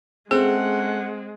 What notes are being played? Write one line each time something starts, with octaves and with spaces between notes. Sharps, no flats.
G#3 A3 C4 C#4 G#4 F#5